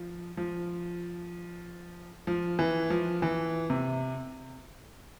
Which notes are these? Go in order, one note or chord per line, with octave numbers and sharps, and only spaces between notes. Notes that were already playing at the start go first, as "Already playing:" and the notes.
Already playing: F3
F3
F3
E3
F3
E3
C3